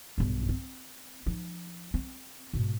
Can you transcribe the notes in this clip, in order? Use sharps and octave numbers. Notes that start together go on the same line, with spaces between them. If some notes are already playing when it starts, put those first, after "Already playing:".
B1 G2
C4
F3 D#4
C4
G#2 B2